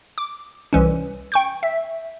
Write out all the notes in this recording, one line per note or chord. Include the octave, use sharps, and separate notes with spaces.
D6
C2 E3 C#4
G5 C#6 G6
E5